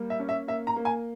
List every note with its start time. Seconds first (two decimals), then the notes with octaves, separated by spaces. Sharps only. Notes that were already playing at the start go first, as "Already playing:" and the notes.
Already playing: G3 A#3
0.10 E5
0.20 C#4
0.29 E5
0.48 A#3 E5
0.67 A#5
0.76 A#3
0.85 G#5